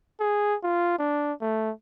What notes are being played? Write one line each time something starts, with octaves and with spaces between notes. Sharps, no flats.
G#4
F4
D4
A3